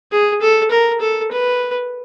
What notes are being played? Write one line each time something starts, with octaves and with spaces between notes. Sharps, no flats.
G#4
A4
A#4
A4
B4